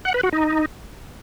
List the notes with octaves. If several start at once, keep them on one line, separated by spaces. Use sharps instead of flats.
F#5
B4
F#4
D#4